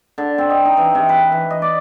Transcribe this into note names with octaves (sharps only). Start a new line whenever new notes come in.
D3
C4
D#5
D#4
E3
C3
B4
E3
D#5
D5